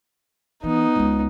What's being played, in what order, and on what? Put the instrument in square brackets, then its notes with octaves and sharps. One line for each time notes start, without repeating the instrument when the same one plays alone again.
[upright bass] E3 [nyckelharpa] B3 D#4
[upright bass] C#2 C#4